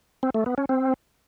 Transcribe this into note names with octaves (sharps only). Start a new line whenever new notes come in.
C4
A3
B3
C#4
C4